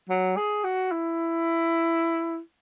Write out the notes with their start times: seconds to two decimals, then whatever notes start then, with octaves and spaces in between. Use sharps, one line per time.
0.10 F#3
0.37 G#4
0.64 F#4
0.92 E4